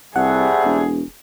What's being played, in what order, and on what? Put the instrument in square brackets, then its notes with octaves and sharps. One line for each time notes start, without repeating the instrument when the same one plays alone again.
[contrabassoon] C2 [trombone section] C3 G3 A3 [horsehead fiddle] G#4 [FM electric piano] F#5
[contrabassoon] E1